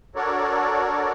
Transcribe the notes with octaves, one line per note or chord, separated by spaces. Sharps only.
D4 F#4 A4 A#4 C#5 D5